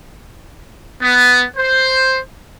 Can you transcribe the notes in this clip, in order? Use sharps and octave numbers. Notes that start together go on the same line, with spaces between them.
B3
C5